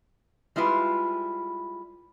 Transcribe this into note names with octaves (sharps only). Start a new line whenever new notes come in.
G3 G#3 E4 F4 B4